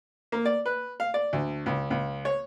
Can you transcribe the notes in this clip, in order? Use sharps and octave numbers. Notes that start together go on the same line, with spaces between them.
A#3
D5
B4
F5
D5
D2
C#2
C#2
C#5